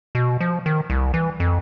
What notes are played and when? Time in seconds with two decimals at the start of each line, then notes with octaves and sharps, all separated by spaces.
0.15 B2
0.41 F3
0.66 D#3
0.90 C2
1.14 E3
1.40 F2